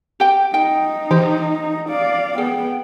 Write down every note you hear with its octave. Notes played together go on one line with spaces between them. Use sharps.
G4 G5
D#4 G5
E3 G4
D5 F5
B3 G#4 G5